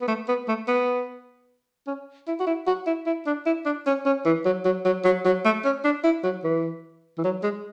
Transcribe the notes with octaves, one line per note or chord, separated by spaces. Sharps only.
B3
A3
B3
A3
B3
C#4
E4
F#4
E4
F#4
E4
E4
D4
E4
D4
C#4
C#4
E3
F#3
F#3
F#3
F#3
F#3
A3
C#4
D4
E4
F#3
E3
E3
F#3
G#3